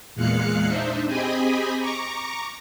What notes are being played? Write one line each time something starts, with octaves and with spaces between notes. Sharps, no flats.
E2 A#2 G#3 F5 F#6 C#7
D4 D#4 C5 E5
C4 G4 G#4 D#5 G#5 B5
A#5 C#6 D6